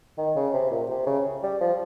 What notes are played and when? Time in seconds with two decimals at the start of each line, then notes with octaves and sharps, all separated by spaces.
0.18 D#3
0.36 C#3
0.54 C3
0.71 A#2
0.90 C3
1.06 C#3
1.43 G3
1.60 F3